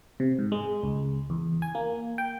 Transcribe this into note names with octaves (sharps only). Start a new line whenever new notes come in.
C3
G#2
G#3
C#2
E2
G#5
A#3
G5